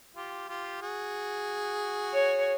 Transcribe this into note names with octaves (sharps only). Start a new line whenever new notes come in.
F4 G4
F4 G4
F#4 G#4
C#5